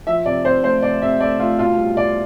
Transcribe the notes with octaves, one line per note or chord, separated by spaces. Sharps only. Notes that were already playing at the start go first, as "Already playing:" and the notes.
F3 E5
C3 D5
C3 C5
A3 C5
C3 D5
C3 E5
A3 D5
A3 F4
B2 F4
G3
B2 D5